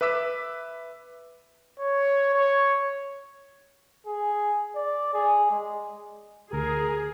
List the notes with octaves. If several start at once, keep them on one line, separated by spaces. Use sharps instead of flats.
B4 E5 D6 E6 B6
C#5
C#5
G#4
D5
G#4
G#3
D2 G#4 A#4